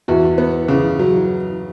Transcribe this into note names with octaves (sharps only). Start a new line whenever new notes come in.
E2 F#4
B3
C#3
F#3